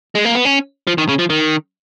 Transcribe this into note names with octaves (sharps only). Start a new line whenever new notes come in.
G#3
A#3
B3
C#4
F3
D#3
C#3
F3
D#3